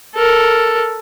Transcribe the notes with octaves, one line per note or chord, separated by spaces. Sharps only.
A4 A#4